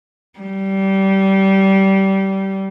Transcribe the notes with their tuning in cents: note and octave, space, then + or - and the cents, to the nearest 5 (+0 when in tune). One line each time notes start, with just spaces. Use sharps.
G3 -20